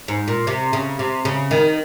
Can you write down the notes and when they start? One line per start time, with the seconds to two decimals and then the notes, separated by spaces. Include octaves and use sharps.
0.08 G#2
0.28 A#2
0.47 C3
0.73 C#3
0.99 C3
1.25 C#3
1.51 D#3